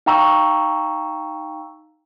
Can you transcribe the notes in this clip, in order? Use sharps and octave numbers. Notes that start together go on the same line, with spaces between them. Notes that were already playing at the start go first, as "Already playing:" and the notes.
D#4 F5 G5 A#5 C#6 E6